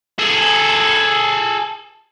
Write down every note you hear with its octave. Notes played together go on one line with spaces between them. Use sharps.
G#4 A4